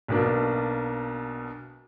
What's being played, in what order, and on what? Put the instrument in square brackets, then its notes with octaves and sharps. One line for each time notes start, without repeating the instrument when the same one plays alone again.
[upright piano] B1 B2 A#3 D4